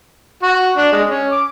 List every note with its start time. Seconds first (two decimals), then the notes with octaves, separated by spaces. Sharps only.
0.43 F#4
0.77 D4
0.92 G#3
1.07 C#4
1.32 D6